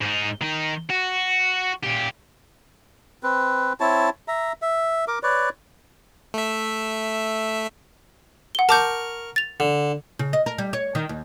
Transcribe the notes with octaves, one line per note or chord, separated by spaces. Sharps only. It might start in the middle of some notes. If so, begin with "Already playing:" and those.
G#2 D#4
D#3 D#4
F#4
A#2 G4
C4 B4
C4 E4 C#5 A5
E5 A#5
E5
A#4 D6
B4 C#5 D5
A3 E5
F#5 G7
A#4 A5 C#6 D6 G6
A6 F7
D3
C#3
D#5
A#4
G3
C#5
D#3
D#2